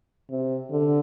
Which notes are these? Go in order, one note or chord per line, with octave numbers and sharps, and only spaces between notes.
C3
D3